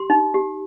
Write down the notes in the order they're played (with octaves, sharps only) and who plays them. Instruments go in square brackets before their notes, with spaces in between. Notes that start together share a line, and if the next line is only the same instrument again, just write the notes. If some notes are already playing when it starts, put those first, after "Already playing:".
Already playing: [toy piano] G4 C6
D#4
G4